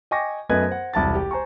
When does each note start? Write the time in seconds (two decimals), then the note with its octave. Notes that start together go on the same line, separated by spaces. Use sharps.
0.11 D#5 G5 G#5 C#6 D6 A#6
0.49 F#2 A3 B3 B4 D#5 G#6
0.68 C5 F#5
0.94 E1 C2 A5 A6
1.15 G4
1.31 C5 G#5 A#5 C#6